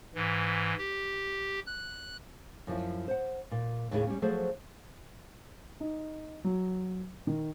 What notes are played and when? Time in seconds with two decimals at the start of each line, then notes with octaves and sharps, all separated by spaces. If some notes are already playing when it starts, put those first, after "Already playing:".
0.15 G#2 E3
0.78 G4
1.67 F#6
2.67 F#2 F3 E4
3.08 C5 F#5
3.51 A#2
3.91 D#2 A2 C#3 E4 G#4
4.07 G3 C#4
4.22 F3 F#3 A3 G#4 C5
5.80 D#4
6.44 F#3
7.27 D#3